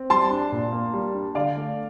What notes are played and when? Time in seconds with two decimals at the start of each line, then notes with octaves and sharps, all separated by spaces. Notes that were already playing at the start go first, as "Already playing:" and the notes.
Already playing: C4
0.10 G3 A5 C6
0.31 D4
0.52 A#2
0.72 A#3
0.94 G3
1.14 D4
1.35 D3 D5 F5
1.56 A3